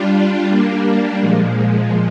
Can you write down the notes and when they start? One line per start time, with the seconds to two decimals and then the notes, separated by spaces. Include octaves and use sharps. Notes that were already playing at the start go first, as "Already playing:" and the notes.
Already playing: G3 D4 F4
0.50 G3 A#3 D4
1.19 A#2 F3 G#3